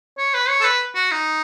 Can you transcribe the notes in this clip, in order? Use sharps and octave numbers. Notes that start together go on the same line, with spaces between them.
C#5
B4
C#5
A4
B4
F#4
D#4